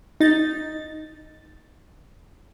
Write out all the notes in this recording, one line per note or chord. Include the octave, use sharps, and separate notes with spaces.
D#4 A6